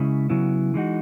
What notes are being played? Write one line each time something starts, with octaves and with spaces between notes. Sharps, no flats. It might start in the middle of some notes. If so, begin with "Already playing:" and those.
Already playing: C#3 G#3 C#4 E4
C#3 F#3 B3 E4
E3 G#3 D#4 F#4